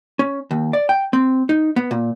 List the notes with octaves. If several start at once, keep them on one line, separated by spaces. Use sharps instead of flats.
C#4
D#2
D5
G5
C4
D#4
B3
A#2